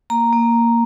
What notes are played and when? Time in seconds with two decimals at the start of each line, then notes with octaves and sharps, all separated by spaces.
0.10 A#3 A#5
0.33 A#3